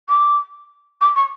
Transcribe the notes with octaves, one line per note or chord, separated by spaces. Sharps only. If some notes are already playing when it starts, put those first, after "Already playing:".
D6
D6
C#6